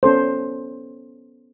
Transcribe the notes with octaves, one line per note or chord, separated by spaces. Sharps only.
B3 C#4 A4 C5